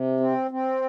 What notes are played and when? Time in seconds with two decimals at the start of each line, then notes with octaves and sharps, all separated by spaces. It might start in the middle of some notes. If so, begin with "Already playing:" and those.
Already playing: C3
0.20 C4
0.51 C4